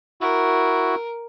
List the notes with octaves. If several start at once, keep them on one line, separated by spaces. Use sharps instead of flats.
E4 F#4 A#4